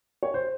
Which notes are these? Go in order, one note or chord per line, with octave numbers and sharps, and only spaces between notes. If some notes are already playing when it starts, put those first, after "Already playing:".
C#5
C5